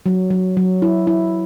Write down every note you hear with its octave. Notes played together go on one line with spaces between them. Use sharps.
F#3
F#3
F#3
E4
E4